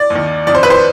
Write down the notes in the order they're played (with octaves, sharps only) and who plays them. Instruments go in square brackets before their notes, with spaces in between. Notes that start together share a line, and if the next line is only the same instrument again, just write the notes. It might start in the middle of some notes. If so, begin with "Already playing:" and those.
Already playing: [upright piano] D5
D#2 D#3
F2 D#3 D5
C5
B4
C5